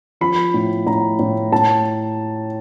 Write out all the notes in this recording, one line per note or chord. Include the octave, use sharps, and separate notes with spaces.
F3 B5
A2
A2 A#5
A2
A2 A5